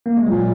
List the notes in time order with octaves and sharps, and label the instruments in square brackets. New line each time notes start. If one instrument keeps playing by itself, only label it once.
[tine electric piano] A#3
G#3
[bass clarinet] A#2 [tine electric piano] F#3